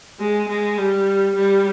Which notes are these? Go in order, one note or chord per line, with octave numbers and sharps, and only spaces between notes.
G#3
G#3
G3
G3